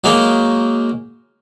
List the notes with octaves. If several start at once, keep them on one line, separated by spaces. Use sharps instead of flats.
F#3 G#3 A#3 D#4